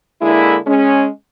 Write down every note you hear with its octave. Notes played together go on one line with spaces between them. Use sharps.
D3 G#3 A#3 E4
G#3 C#4